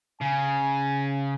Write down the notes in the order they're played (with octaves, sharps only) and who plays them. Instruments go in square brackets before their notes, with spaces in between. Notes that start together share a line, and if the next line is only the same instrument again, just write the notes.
[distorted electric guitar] C#3 [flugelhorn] G#5